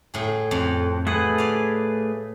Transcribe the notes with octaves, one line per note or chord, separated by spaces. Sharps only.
A2 G#4
F2
A3 G#4 B4 F#5
D5 F5